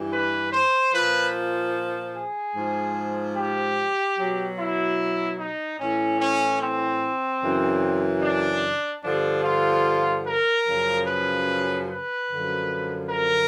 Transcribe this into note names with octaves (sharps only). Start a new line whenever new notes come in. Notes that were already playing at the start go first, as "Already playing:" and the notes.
Already playing: G2 E3
B4
C5
A#2 F3 B4
G#4
G#2 F3
G4
B2 F#3
E4
D#4
A2 E3 C#4
C#4
C4
F#2 C#3 E3
D4
G2 D3 F3 D4
F4
A#4
F#2 C#3 F3
B4
B4
F#2 D3 F3
A#4